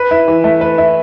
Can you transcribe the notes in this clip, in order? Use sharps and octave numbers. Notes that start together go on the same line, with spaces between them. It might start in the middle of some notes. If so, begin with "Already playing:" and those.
Already playing: B4
E4
E3
A3
B4
E4